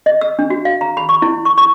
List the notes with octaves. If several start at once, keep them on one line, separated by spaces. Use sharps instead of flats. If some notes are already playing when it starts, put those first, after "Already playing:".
D#5
E6
D4
F#4
F5
A#5
B5
C#6
E4
C#6
C#6